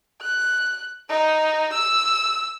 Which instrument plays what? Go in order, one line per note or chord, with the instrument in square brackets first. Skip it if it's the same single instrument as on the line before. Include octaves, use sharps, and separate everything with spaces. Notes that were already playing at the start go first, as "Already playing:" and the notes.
[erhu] F#6
D#4
E6